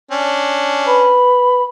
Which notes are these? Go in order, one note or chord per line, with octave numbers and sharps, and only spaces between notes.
C#4 D4
B4 B5